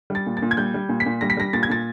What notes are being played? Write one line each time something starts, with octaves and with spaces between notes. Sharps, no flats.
G3 A6
A#2
A6
A#2
G#6
G3 G6
G3
A#2
B6
A#2
G3 A#6
B6
G3 A#6
A#2 A6
G#6
A#2 A6